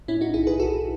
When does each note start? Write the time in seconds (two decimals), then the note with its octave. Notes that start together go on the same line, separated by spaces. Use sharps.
0.08 A2 C#4 E4
0.21 D#4 F#4
0.34 B1 E4 G#4
0.47 G#4 B4
0.60 B1 F#4 A4